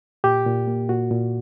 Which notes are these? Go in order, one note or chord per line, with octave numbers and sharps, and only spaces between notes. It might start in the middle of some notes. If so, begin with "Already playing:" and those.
A#2 G4
A#2
A#3
A#2 F#4
A#2